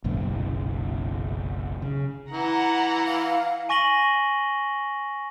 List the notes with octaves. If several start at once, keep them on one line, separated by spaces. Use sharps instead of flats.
F#1 B1 F#2 A#2
C#3
E3 F#5 A#5
F5
G#5 C#6 A#6 D#7 F#7 G7